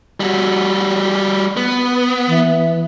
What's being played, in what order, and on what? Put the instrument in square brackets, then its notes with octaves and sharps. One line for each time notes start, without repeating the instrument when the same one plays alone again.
[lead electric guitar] G3 F#4
B3
[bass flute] E3